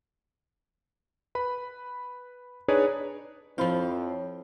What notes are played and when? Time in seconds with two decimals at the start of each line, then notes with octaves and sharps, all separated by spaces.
1.35 B4 B5
2.68 D4 D#4 G#4 B4 C#5 D5
3.58 F2 F3 C4 E4 F4 C#5 D#5 B5